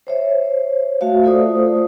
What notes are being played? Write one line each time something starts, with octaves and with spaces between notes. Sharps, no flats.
C5 C#5 E5
A3 F#4 E5 F5
A3 F4 A4 C5 D5 D#6